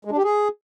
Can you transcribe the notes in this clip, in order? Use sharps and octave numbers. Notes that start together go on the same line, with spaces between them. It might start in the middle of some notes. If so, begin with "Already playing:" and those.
G#3
D4
G4
G#4